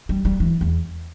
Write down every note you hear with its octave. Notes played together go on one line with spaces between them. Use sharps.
G3
G3
E3
E2